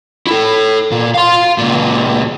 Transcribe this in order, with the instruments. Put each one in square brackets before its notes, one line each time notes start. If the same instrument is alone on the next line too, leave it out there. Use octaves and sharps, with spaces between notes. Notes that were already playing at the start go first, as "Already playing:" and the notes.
[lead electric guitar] E4 A4
A#2
F5 C6
C#2 A#2